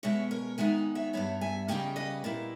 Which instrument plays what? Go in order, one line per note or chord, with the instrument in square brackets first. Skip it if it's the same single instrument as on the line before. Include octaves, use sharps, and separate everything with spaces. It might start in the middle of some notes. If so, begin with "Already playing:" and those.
[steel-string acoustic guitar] B2 G#3 C#4 C#5 E5
A#4 C#5
D#3 G#3 B3 D#4 E5 G#5
C#5 E5
G2 G3 B3 C#5 E5
E5 G#5
C#3 E3 G3 A#3 C#4 D#5 G5
B4 D#5
A#2 A#3 E4